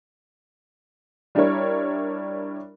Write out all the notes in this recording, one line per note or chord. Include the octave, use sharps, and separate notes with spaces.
G3 D4 E4 A#4 C#5